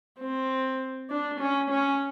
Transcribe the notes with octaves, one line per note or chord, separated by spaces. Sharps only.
C4
D4
C#4
C#4